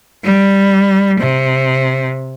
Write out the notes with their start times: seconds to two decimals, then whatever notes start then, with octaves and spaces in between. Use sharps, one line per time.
0.24 G3
1.20 C3